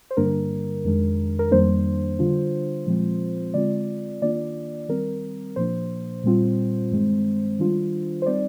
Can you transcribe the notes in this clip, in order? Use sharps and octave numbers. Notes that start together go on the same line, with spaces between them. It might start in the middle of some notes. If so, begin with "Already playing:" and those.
C5
G2 D3 G3 A#3 D4 A#4
F2 D#3 G#3 D4
A#4
F2 D#3 G3 A#3 D4 C5
D3 G3 D4 F4
A#2 F3 G#3 C4 F4
D3 G#3 C4 F4 D5
D#3 A#3 D4 F4 D5
D#3 G3 C4 A#4
A#2 F3 A#3 D4 C5
A#2 G3 C4 F4
G2 D#3 G#3 C4
D#3 G3 D4 F4
C5
G3 C4 D#4 D5